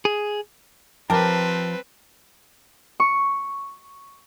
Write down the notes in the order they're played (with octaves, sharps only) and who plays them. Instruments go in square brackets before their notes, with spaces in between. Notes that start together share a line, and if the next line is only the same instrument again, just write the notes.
[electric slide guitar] G#4
[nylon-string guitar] F3 [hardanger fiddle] C4 B4 [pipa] G4 A#4 [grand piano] A5
[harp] C#6